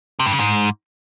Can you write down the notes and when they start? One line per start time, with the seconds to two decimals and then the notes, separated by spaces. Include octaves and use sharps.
0.20 C3
0.26 G2
0.32 C#3
0.39 G#2